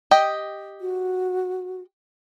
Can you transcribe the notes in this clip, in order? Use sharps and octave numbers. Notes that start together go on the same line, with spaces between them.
G4 D#5 G5
F#4